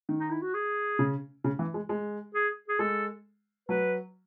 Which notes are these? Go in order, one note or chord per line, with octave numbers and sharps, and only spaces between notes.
D#3
D#4
E4
F#4
G#4
C#3
C#3
E3
G#3
G#3
G#4
G#4
G#3 A4
F#3 B4